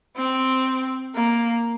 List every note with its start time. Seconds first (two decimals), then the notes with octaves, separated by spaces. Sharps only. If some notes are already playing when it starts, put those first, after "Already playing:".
0.17 C4
1.15 A#3